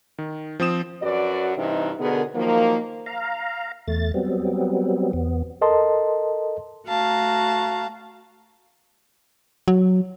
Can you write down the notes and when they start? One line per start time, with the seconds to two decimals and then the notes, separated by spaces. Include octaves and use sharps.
0.18 D#3
0.60 F3 C4 D#6 E7
1.02 F#2 F#4 B4 D5
1.58 G2 C3 E3 D#4
2.00 B2 D3 B3 G#4 A#4
2.35 D#3 F3 F#3 A#3
3.06 F5 A#5
3.88 E2 A3 A6
4.14 F#3 G3 B3 C4
5.13 E2 B3
5.61 A4 A#4 D#5 A5 C6
6.86 A3 F#4 F5 A5 A#5
9.68 F#3